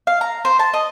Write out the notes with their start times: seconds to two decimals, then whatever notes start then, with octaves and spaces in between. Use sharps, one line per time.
0.07 F5
0.21 A#5
0.45 C5
0.59 A5
0.74 D#5